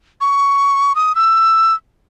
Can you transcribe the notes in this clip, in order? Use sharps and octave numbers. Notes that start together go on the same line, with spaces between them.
C#6
D#6
E6